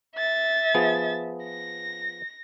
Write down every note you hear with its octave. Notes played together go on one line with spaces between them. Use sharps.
E5 A6
F3 B3 G#4
A#6